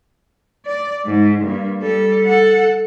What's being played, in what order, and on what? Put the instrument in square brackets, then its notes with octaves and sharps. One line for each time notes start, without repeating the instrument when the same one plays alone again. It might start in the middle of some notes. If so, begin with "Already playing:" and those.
[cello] D5
G#2
G2 A#3
G3 A4
A4 F#5